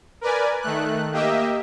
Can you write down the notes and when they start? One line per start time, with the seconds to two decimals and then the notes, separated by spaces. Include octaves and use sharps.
0.21 A#4 B4 D5 G#5
0.62 D#3 A3 F#6
1.12 A#3 G4 D#5 E5